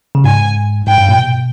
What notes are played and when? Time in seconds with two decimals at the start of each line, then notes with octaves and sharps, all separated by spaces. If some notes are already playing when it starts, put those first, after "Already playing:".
0.15 C#3
0.24 G#2 G#5
0.87 G#2 G5
0.98 G2
1.09 A#2
1.19 B2